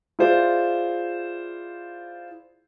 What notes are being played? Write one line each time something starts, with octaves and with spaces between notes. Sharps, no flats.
E4 F4 G#4 C5 D5